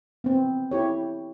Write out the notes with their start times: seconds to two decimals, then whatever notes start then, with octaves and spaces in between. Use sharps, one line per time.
0.24 B3 C4
0.71 E4 G4 C#5